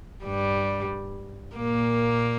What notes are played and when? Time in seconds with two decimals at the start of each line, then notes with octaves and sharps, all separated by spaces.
0.24 G2 G3
1.56 A#2 A#3